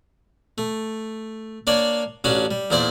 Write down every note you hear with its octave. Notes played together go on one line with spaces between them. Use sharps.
A3
A#3 D4 C#5 D5
A1 C#4 D4 F#4 F5
G3
E2 A#2 E4 C5 D5